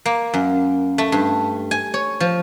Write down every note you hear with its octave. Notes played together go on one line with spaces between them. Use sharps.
A#3
F#2
A3
G2
G#5
C#5
F3